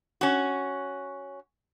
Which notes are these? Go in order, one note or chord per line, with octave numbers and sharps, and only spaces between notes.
C#4 F#4